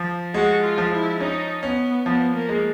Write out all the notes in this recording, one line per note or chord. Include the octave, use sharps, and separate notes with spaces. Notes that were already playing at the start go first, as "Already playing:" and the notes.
Already playing: F3
G#3 F#4
F4
F3
E4
C#4 D#4
B3 C#4
F3 B3
A#3
G#3